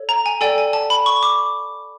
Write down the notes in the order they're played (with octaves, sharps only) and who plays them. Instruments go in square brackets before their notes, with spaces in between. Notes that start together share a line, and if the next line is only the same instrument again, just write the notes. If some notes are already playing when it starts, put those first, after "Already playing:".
Already playing: [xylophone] A4 C#5
A#5
G#5
A4 D5 G5 G#5
G#5
A5
B5
C#6
D6